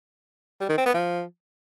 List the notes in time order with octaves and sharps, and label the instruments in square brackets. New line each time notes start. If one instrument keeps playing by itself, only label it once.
[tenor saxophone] G3
D#3
C4
B3
F3